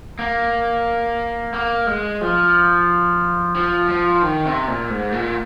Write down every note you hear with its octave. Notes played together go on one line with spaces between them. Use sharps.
A#3
A#3
G#3
F3
F3
F3
D#3
C3
A#2
G#2
A#2